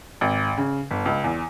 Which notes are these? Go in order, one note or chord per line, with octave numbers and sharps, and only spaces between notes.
G#1
C#3
G1
C#2
E2